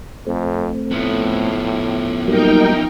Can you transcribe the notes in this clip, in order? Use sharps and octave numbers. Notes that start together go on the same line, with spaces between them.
F2 A3 C4
A2 F3 B3
F#3 G3 A#3 D#4 A#4 G5